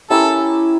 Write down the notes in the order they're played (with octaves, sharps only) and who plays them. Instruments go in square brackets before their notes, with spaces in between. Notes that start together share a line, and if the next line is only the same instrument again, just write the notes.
[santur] C#4 E4 G4 A#4 [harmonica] A4